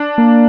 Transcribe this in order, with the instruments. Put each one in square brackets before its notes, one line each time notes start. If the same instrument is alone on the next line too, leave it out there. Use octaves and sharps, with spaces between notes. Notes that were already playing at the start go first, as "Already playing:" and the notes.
Already playing: [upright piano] D4
[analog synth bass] A#3